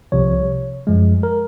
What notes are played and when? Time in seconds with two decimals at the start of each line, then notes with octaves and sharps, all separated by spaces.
0.12 C2 C3 F3 C#5
0.87 F#2 F3 G#3
1.23 A#4